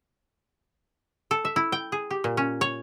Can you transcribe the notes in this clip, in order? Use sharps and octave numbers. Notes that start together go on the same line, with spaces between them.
A4
E5
E4
G5
G#4
G4
A#2
C#4
C#5